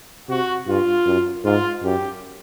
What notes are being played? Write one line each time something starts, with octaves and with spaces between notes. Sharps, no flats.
C3 F#4
G2 F4
F#2
G#2 F4
F#2 G4